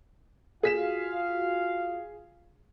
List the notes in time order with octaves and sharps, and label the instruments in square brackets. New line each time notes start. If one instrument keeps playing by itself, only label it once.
[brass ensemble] F4 F#4 F5 [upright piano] G#4 B6 E7